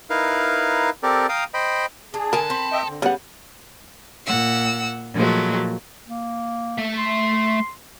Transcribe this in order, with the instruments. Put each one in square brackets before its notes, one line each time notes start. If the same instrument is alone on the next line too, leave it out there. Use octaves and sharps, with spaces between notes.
[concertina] D#4 E4 A#4 B4 F5
C4 G4 A4 A#4 D5
F5 G5 A#5 D#6
C5 D#5 G5 B5
[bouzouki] D4 [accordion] G#4
[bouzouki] D3 G#5 [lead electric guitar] A4 [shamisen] A#4
[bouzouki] C4 [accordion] B5
[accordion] D#5 E5 G5
D3
[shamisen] C#3 F#5 [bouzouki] G3 B3
[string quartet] A#2 F#5 E6
A#2 F3 F#3 G#3 A3
[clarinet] A#3
[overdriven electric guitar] A3 E5
[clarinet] C6